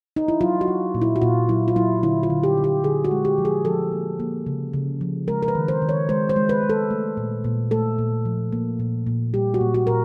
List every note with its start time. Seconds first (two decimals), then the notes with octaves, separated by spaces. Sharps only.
0.16 D#4
0.28 E4
0.41 F#3 F4
0.61 F#4
0.68 F#3
0.95 A#2
1.02 E4
1.16 F#4
1.22 A#2 F4
1.49 F#3 E4
1.68 F4
1.76 F#3 E4
2.03 D3 E4
2.23 F4
2.30 D3
2.43 G4
2.58 D3
2.64 G4
2.84 D3 G#4
3.05 F#4
3.11 G#3
3.25 G4
3.38 F3
3.45 G#4
3.65 F3 A4
3.92 A#3
4.20 A#3
4.46 C#3
4.73 C#3
5.01 F3
5.28 G#3 A#4
5.43 A#4
5.48 B4
5.55 D#3
5.68 C5
5.82 D#3
5.89 C#5
6.09 G#3 C5
6.29 C5
6.36 G#3
6.49 B4
6.63 G#3
6.69 A4
6.91 A3
7.17 A#2
7.44 A#2
7.71 A3 A4
7.98 A#2
8.25 F3
8.52 A#3
8.80 A#2
9.07 A#2
9.34 G3 G4
9.54 F#4
9.61 A#2
9.74 F#4
9.87 A#2 A#4